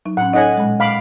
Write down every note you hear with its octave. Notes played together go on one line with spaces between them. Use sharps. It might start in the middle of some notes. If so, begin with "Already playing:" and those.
F#3 D#4
A2 C#4 F#5
D#4 A4 C#5 D#5 F#5 G#5
A#2 G#3
F5 B5 D6